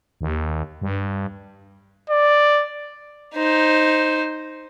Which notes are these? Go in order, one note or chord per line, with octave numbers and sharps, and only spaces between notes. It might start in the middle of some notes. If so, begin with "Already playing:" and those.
D#2
G2
D5
D#4 C5